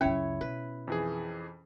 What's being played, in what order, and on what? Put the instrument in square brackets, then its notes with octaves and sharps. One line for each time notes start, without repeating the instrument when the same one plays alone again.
[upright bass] C#2 F#2 [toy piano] C#4 [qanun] E4 C#5
[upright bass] B2 [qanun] B4
[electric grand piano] F2 E3 G#4